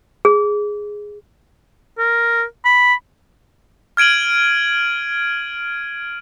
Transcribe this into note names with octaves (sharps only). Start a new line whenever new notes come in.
G#4
A#4
B5
F6 G#6 D7 D#7 F#7